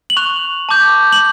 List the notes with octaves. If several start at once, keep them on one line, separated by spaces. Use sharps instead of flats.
F#7
C#6 F#6 F7
A5 D6 G6
F#7